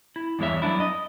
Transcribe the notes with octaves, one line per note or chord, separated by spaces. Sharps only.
E4
E2 G2 G#3 C#5 E5
F#3 B3 D4 E4
D#5